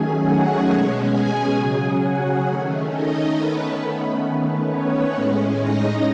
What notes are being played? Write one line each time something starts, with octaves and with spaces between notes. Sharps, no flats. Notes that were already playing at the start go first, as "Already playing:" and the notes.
Already playing: D#3 F#3 A3 C#4 G#4 G#5
F#4 F#5
B2 G#3 C#4
G#4 G#5
C#3 F#3 C#4 G#4 G#5
F#4 F#5
D#3 A3 C#4
D#4 D#5
D#3 A3 B3 C#4 B4
D#3 A3 B3 C#4 B4
C#4 C#5
A2 G#3 C#4
D#4 D#5